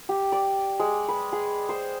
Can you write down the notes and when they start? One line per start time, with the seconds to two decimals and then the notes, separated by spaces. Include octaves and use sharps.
0.09 G4
0.32 D5
0.80 G#3
1.09 B4
1.33 G#4
1.69 C5